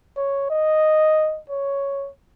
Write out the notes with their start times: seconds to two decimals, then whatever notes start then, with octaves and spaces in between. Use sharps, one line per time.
0.17 C#5
0.50 D#5
1.50 C#5